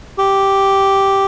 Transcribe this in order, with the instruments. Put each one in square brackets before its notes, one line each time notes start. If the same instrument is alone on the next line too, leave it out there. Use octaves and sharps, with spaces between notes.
[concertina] G4